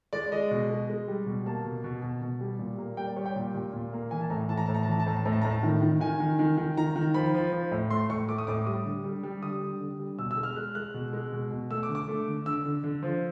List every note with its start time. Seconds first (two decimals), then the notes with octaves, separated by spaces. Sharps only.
0.13 G#3 D5
0.32 G#3 D#5
0.51 B2
0.70 G#3
0.90 G#3
1.08 G3
1.26 B2
1.46 A#3 A5
1.65 B2
1.84 B2
2.03 B2
2.22 B2
2.41 G3
2.59 A#2
2.78 A#3
2.97 G3 G5
3.07 D5
3.16 G3 C#5
3.26 G5
3.36 A#2
3.54 A#2
3.73 A#2
3.93 A#3
4.11 E3 G#5
4.21 A5
4.30 A2 A#5
4.49 E3 A5
4.57 A#5
4.66 A2 A5
4.75 A#5
4.83 A5
4.87 E3 A#5
5.00 A5
5.06 A2 A#5
5.17 A5
5.25 A2 A#5
5.33 A5
5.42 A2 A#5
5.50 A5
5.63 D#3
5.82 D#3
6.00 D#3 G#5
6.20 D#3
6.39 D#3
6.58 D#3
6.77 D#3 A#5
6.96 D#3
7.14 F3 B5
7.34 F3
7.52 F3
7.71 A2
7.90 A3 C6
8.10 A2 C#6
8.28 A3 D6
8.38 D#6
8.47 A2 D6
8.66 G3 D#6
8.85 D3
9.04 G3
9.24 G3
9.43 D3 D#6
9.61 G3
9.80 D3
10.00 G3
10.19 B2 E6
10.31 E6
10.37 G#3
10.43 F6
10.56 G#3 F#6
10.75 G#3 F#6
10.94 B2
11.13 G#3
11.32 B2
11.51 B2
11.70 A3 E6
11.83 D6
11.89 D3
11.95 D6
12.08 A3
12.27 D3
12.46 D3 E6
12.65 D3
12.84 D3
13.03 F3